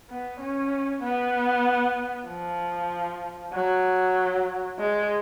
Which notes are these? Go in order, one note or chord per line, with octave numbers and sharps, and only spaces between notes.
B3
C#4
B3
F3
F#3
G#3